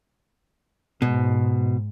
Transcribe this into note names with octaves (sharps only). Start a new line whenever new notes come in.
G#2 B2